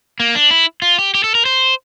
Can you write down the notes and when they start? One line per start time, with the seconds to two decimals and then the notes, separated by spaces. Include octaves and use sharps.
0.20 A#3
0.35 D4
0.51 E4
0.82 F4
0.99 G4
1.15 G4
1.24 A4
1.35 A#4
1.45 C5